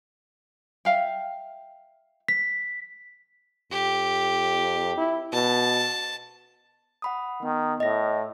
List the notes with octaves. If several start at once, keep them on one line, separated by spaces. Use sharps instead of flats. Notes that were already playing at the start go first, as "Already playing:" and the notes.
E5 F5 G5
B6
F2 G4
E4
B2 A5
F#5 B5 D#6
D#3 B3
A2 D#5 A#6